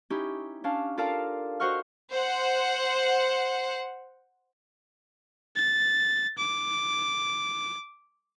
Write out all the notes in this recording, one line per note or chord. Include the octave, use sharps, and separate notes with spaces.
C#4 D#4 E4 G4
C#4 D4 F5 A5
F4 A4 A#4 D5 F5 A5
F#4 C5 D#5 F#5 C#6 F6
C5 F#5
A6
D6